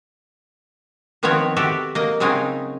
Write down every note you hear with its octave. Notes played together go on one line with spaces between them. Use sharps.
D#3 F3 B3 C4 F#4 C#5
F#4 G4 A4 E5
A#3 D#5
C#3 F#3 G#3 C4 C#4 D#4